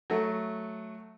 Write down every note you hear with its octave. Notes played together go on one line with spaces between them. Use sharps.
F#3 A3